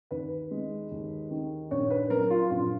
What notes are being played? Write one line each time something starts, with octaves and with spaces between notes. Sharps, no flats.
D#2 B4
G#3
D#2
D#3
A#1 C#5
B4
F#3 A#4
F4
A#1 F4